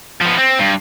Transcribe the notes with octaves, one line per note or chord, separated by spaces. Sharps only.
F3 B3
C4
G2